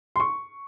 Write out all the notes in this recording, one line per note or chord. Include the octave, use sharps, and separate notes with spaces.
C6
C#6